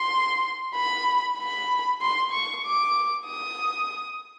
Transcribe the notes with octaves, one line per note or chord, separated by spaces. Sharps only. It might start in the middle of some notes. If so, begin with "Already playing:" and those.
Already playing: C6
B5
B5
C6
C#6
D6
D#6